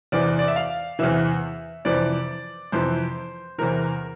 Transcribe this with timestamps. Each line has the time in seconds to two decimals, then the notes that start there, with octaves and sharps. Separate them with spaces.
0.12 E2 C3 E3 D5
0.39 D5
0.48 E5
0.56 F5
0.99 E2 C3 E3 E5
1.85 F2 C3 E3 D5
2.72 F2 C3 E3 C5
3.58 E2 C3 E3 A#4